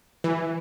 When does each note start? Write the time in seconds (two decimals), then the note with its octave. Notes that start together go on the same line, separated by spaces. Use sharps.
0.24 E3